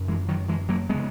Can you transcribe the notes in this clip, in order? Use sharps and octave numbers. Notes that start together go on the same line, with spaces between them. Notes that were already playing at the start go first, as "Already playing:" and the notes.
Already playing: F#2 C#3
E3 G#3
D#3 F#3
E3 G#3
F#3 A#3
C#3 G#3 B3